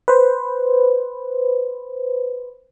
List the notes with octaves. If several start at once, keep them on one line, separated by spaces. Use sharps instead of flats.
B4 C5